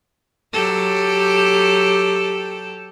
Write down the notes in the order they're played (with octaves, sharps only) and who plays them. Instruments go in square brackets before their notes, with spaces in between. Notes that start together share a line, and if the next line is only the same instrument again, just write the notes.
[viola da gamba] F#3 G4 A4